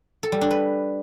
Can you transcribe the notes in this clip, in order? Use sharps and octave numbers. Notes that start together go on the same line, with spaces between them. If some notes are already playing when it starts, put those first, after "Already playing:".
A4
G3
D4
B4